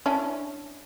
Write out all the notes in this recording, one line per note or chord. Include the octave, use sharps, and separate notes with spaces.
C#4 D4 E4